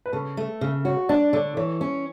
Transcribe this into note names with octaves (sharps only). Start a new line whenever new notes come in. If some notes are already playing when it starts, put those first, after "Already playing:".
B4
C#3 A4
A3
C#3
F#4 C#5
D4 D5
D3 C#5
E3 C#5
C#4